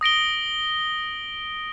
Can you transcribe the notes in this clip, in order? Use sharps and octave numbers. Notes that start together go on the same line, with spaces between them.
D#6 A#6 D7 G7